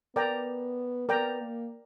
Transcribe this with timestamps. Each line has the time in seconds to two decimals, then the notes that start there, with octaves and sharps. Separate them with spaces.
0.15 B3 A#4 D5 G5 A#5
1.09 B3 A#4 D5 G5 A#5
1.41 A#3